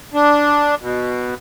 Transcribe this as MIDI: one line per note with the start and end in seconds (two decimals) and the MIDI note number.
0.14 0.75 62
0.81 1.34 47